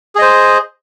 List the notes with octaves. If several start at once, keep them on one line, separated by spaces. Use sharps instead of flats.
G#4 C5 D#5